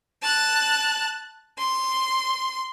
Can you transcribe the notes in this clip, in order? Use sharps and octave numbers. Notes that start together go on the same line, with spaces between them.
A5 F#6
C6